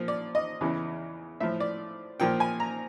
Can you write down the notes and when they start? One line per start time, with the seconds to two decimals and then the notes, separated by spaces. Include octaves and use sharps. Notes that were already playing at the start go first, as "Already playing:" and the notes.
Already playing: A#2 F3
0.08 D5
0.35 D#5
0.61 E2 C#3 E3
1.40 A2 F3 E5
1.60 D5
2.20 A#2 F3 G5
2.40 G#5
2.60 A#5